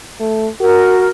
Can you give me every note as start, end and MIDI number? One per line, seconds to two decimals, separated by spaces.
0.20 0.47 57
0.61 1.08 66
0.61 1.10 70